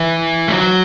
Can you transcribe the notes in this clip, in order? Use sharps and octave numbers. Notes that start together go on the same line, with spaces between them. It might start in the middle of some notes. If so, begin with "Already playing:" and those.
Already playing: E3
A3
F#3